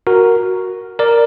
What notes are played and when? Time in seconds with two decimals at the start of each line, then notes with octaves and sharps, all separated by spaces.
0.07 F#4 A#4
0.99 A#4 D5